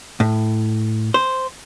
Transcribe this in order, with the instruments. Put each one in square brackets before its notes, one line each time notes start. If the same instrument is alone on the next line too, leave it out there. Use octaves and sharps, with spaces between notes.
[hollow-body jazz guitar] A2
C5